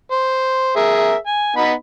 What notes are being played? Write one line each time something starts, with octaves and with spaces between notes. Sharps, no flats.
C5
G#4 A#4 E5
G#5
B3 D#4 B5